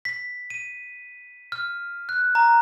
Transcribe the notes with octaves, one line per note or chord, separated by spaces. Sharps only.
B6
D#7
F6
F#6
A#5